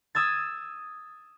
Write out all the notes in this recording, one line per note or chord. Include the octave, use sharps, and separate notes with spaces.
D#6 E6 G#6 A6